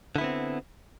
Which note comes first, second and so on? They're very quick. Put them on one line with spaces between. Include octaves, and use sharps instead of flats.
D3 E4 B3 C4